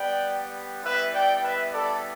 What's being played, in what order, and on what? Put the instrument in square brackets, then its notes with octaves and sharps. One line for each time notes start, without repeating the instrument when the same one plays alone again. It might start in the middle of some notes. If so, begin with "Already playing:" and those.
Already playing: [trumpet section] G3 B3 G4 D5 G5
G3 B3 E4 B4 E5
D5 G5
B4 E5
A4 D5